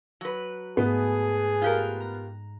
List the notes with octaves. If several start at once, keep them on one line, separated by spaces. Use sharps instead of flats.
F#3 B4
G#2 A3 B3 G#4
F4 G4 A#4 F#6
A#5